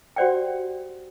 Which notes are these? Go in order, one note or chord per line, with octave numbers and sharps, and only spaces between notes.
F#4 G4 C5 D5 F#5 G5